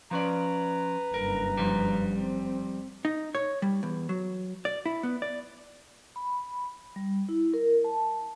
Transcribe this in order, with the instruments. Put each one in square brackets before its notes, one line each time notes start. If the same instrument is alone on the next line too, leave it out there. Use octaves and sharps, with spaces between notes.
[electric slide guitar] F3 C#4 D5 [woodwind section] B4 A#5
[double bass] F#1 G2 [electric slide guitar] A#4
[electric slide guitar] F3 G3
[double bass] C4
[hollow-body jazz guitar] D#4
C#5
G3
E2
F#3
D5
E4
B3
D5
[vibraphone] B5
G3
E4
A#4
A5